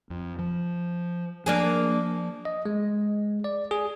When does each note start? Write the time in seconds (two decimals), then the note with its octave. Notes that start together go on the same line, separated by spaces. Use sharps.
0.10 F2
0.39 F3
1.46 F3 A#3 D4 G#4
2.45 D#5
2.66 G#3
3.44 D5
3.71 G#4